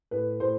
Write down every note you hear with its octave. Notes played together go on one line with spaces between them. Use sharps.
A2 B4
A2 C5